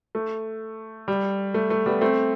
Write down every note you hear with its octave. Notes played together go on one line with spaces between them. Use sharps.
A3
G3
A3
A3
G3 B3
A3 C4